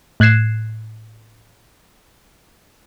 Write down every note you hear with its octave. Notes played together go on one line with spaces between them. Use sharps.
A2 F#6 G#6 C7 E7